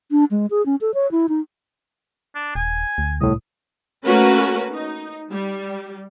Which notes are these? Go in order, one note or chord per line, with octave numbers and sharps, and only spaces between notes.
D4
G#3
G#4
C#4
A4
C#5
E4
D#4
D4
D#1 G#5
D2
C2 A2 D#6
A3 A#3 C#4 F#4 A#4 B4
D#4
G3